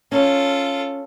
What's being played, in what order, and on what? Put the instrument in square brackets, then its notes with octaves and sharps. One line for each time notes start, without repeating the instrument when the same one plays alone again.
[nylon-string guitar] C#4 [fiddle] F4 A4